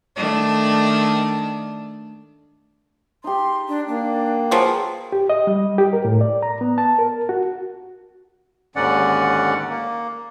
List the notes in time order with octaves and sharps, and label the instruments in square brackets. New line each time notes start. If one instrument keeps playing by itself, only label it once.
[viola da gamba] D#3 A3 D4
[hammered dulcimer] D#4 G4 [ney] C6
[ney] D4
[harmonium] A#3 [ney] D4
[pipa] F3 F#3 [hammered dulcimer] G#4 A#4 B4
[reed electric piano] G4
D#5
G3
G4
A#4
A2
D5
A#5
B3
A5
A#4
F#4
[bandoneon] D#2 G#2 D3 C#4 D5 F#5
A#3